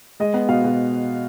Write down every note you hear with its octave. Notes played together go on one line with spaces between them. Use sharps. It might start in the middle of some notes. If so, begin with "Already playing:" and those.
G#3 D#5
B3
B2 F5
B2